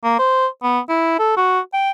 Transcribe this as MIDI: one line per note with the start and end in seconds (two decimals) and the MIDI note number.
0.04 0.15 58
0.19 0.47 72
0.63 0.80 59
0.89 1.15 64
1.19 1.33 69
1.37 1.60 66
1.74 1.91 79